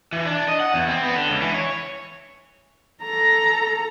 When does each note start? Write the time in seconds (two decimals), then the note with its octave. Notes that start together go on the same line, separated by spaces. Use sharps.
0.13 E3
0.26 D4
0.48 D#5
0.60 F#5
0.74 E2
0.89 C4
1.03 B3
1.15 D3
1.29 C#2
1.42 E3
1.54 C#5
3.02 A4 A#5